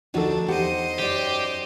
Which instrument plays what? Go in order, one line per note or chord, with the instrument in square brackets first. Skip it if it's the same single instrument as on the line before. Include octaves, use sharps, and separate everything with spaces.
[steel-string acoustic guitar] D2 F3 F#4 [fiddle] D4 [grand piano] D#4 A4
[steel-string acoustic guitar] E2 G4 F#5 [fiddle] C5 D#5
[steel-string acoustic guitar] F#2 D5 [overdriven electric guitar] G4